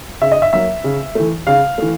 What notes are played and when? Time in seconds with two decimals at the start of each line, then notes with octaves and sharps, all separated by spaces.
0.21 C#3 E5
0.32 D#5
0.42 E5
0.53 F#3 A#3 E5
0.84 C#3
1.15 E3 A3
1.47 C#3 F5
1.78 E3 A3